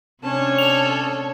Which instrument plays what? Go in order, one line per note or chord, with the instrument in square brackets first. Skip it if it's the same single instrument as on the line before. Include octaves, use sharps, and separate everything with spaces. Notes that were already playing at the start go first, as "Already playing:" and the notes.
[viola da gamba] C3 C#5 [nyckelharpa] C#4 D4 [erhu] A5
[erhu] A4 [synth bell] F7